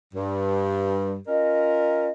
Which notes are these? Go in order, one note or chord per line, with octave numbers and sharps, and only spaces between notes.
G2
C#4 F4 A#4 D#5